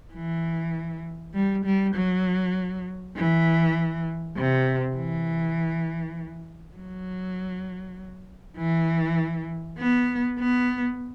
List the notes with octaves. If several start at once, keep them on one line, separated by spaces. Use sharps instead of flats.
E3
G3
G3
F#3
E3
C3
E3
F#3
E3
B3
B3